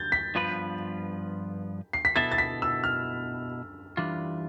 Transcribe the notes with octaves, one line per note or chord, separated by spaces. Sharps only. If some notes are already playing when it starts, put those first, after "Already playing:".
Already playing: G6 A6
B6
G2 F3 B3 F4 B4
C7
B6
B2 B3 E4 A4 E5 A6
A6
B6
E6
F6
E3 G3 D4 F4